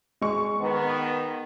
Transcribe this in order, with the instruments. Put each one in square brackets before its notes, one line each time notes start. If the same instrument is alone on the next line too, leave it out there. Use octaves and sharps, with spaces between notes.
[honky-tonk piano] G#3 C#6
[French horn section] D#3 B3